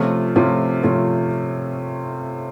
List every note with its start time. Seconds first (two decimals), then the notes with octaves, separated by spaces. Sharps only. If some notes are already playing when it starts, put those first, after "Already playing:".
Already playing: C3 F3 A3 C#4 F4
0.35 C3 F3 A3 C#4 F4
0.83 C3 F3 A3 C#4 F4